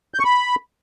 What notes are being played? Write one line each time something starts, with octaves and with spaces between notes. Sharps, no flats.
G6
C#6
B5